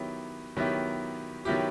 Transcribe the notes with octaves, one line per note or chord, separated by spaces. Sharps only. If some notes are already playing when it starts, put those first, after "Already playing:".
Already playing: D#3 F#3 B3 E4 G4
D#3 F#3 B3 E4 G4
D#3 F#3 B3 E4 G4